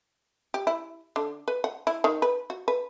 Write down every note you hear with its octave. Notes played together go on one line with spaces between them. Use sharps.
G4
E4
D3
B4
F#5
E4
D#3
B4
F#4
B4